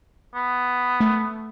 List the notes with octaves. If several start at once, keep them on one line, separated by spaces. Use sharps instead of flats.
B3
A3